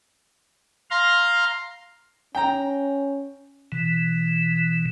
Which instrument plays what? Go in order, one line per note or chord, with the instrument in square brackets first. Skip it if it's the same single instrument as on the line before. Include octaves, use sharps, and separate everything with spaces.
[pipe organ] F5 A#5 C6
[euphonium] C#4 [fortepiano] G5 A#5
[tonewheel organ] B2 E3